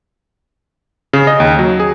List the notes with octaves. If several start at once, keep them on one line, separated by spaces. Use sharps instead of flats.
C#3
D#5
D#2
F#3
G#4